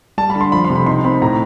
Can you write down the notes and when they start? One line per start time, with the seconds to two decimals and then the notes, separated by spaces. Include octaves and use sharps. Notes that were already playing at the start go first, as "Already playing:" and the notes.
0.18 G3 A5
0.30 B5
0.35 D3
0.41 C6
0.52 F3 B5
0.64 C6
0.70 C3
0.76 B5
0.86 D#4 C6
1.04 C4 B5
1.22 A2 A#5